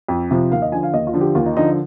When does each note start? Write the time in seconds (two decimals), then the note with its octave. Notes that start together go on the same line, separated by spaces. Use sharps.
0.08 F2
0.31 C3 F3
0.51 D#2 F5
0.62 D#5
0.72 D3 F3 G#5
0.83 F5
0.93 D#2 D#5
1.07 F4
1.14 D3 F3
1.21 G4
1.35 D#2 F4
1.46 D#4
1.57 D3 F3 D#4